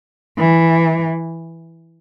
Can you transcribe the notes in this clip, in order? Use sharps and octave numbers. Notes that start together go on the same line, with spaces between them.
E3